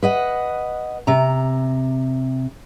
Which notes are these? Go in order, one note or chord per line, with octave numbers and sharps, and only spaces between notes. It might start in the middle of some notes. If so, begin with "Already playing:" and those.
B4 D#5 F#5
C3 A#5